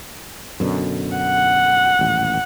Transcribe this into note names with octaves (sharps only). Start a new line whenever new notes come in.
F#2 B2 D3
F#5
D#1 A1